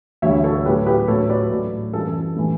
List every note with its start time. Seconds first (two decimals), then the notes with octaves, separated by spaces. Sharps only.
0.22 D2 D3 G3 C#5 E5
0.44 A4 C#5
0.65 A2 G4 B4
0.69 F#3
0.86 G4 B4
1.08 A2 F#3 A4 C#5
1.30 B4 D5
1.51 A2 F#3
1.93 F#2 E3 G3 A4
2.37 A2 E3 G3